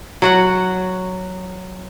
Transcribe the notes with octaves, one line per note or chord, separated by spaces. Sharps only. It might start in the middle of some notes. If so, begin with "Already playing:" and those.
F#3 F#4 F#5